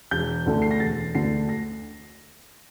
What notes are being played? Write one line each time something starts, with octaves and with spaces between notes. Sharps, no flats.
E1 G6
D2 D3 A3
C7
A#6
E1 A6
D2 D3 A3 C7
D2 A#6